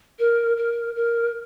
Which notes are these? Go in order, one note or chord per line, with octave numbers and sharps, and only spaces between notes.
A#4
A#4
A#4